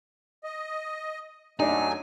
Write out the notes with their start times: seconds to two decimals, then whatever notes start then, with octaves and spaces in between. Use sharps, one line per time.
0.44 D#5
1.60 F#2 F#3 A3 D4 D#4 G#5